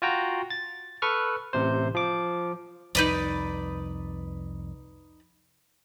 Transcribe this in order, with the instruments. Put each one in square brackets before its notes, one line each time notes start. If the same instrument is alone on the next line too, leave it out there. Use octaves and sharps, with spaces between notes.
[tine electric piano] F4 F#4 G5 A#5
A6
A4 B4 C#6 F6
A1 C3 C5
F3 D6
[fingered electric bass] C2 F2 [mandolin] D#4 B4 D5